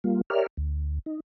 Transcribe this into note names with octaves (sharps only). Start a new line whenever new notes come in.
G3 A#3 F4
G4 A#4 C#5 D5 E5 F6
D2
D#4